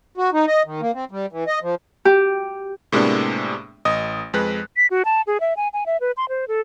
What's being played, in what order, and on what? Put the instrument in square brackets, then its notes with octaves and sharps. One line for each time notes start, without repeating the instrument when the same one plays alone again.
[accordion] F#4
D#4
D#5
D#3
A#3
C4
G3
E3
D#5
F3
[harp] G4
[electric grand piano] A2 C3 G#3 A#3 B3 D4
A1 D#5 D#6
F2 G#3 B4 F#6
[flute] B6
F#4
A5
G#4
E5
G#5
G#5
E5
B4
C6
C5
A4